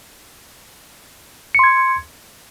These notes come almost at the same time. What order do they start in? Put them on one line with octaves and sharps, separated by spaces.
C#7 C6 G#6